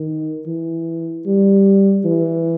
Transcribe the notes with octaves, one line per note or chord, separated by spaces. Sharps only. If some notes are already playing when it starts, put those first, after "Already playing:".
Already playing: D#3
E3
G3
E3